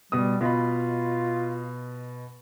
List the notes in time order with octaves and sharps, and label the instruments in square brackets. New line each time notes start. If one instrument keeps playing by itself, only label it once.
[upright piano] B2 D#6 [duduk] G3
[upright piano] B2 D#5 B5 [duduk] F4